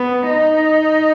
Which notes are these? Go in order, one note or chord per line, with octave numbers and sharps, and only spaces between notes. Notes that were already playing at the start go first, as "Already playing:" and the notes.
Already playing: B3
D#4